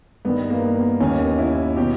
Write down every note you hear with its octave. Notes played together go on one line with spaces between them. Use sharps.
G2 D#3 B3
A#3
B3
D#2 D#3 C#4
E4
B2 G4